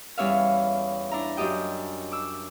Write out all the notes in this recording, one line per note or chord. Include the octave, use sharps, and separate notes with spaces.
E2 G3 C#4 C#5 E5 F5
D4 E4 A#5
F#2 D4 G4 D#5 G5
D6 E6